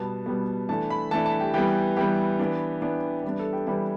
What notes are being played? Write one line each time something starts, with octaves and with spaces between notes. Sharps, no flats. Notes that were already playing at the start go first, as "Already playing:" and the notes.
Already playing: B2 G3 B3 A5
B2 G3 B3
E3 A3 D4 A5
B5
E3 A3 D4 A5
A5
G4
E3 G3 B3 G4
E3 G3 B3 G4
E3 B3 D4
E3 B3 D4
E3 G3 B3 D4
A4
G4
E3 G3 B3 D4 E4